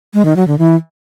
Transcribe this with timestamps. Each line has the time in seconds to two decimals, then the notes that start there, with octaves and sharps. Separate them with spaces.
0.14 G#3
0.25 D#3
0.36 F#3
0.47 D3
0.59 E3